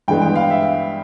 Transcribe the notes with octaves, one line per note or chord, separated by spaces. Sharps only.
G2 E3 G#3 B3 G5
G5
F5
E5